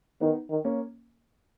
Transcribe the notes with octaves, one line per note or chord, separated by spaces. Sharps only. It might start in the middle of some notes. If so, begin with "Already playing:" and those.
D#3 B3 D#4
D#3
A#3 C#4